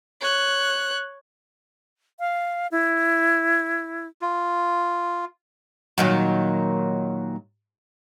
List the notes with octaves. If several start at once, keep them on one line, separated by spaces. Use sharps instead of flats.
C#5 F#6
F5
E4
F4
A#2 D#3 F#3